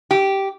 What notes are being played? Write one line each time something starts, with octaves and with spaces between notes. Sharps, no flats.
G4